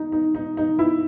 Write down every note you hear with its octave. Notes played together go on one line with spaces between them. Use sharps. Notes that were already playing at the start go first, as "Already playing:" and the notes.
Already playing: D#4
D#4
D#4
D#4
E4